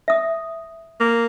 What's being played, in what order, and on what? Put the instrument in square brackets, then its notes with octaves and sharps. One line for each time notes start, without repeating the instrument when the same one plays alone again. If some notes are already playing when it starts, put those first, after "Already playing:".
[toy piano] E5 D#6
[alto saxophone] A#3